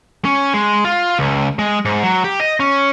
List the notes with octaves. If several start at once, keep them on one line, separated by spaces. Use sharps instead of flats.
C#4
G#3
F4
C#2
G#3
G#2
F#3
G4
D#5
C#4